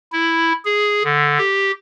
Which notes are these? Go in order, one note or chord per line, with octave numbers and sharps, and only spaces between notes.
E4
G#4
D3
G4